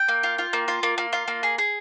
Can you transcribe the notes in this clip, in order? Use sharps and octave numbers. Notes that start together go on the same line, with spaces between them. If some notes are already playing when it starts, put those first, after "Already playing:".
Already playing: G5
A#3
F4
F4
A#3
F4
A#3
A#3
F4
A#3
G#4
G#4